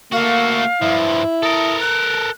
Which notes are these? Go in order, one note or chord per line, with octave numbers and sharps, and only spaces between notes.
A3 A#3 F#4 F5
G2 F3 E4
A4 A#4 D#6
F#6